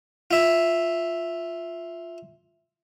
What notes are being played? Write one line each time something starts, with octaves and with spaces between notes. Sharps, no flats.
F4 E5